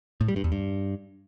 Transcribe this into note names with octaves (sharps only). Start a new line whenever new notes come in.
A2
G3
G2
E2
G2